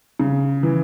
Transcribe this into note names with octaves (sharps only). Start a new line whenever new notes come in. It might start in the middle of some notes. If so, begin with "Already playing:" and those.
C#3
E3